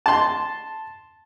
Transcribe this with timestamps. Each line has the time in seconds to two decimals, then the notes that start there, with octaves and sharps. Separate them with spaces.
0.06 A5 C6